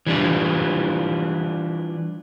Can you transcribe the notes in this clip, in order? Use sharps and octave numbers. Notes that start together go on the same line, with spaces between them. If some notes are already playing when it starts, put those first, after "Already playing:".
E3 G3 D4 F4